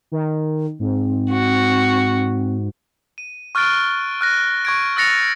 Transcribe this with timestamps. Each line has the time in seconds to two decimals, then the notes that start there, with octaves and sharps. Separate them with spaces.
0.12 D#3
0.79 G#2 C4
1.30 F#4
3.18 D#7
3.55 C#6 F6 F#6 A6 D7 G7
4.21 F6 F#6 A#6
4.65 C#6 G#6 D7
4.96 E6 F#6 A6 A#6 C#7 F7